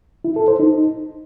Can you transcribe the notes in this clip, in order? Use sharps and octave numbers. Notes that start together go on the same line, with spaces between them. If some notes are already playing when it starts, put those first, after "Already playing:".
E4
A4
C5
D#4